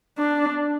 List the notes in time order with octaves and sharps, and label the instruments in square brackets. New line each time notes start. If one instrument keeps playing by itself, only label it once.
[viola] D4